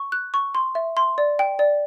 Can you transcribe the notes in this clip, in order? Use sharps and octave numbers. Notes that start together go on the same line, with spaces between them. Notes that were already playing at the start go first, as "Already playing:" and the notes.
Already playing: C#6
F#6
C#6
C6
E5
C6
D5
G5
D5